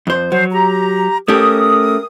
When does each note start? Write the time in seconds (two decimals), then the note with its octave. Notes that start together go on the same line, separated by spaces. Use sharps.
0.07 F2 C5
0.32 F3 F#3 C5
0.52 G4 A#5
1.28 A3 C#4 G4 A#4 D#6